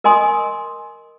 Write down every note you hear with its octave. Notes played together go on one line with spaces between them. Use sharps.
A#4 D#5 G#5 C6 D#6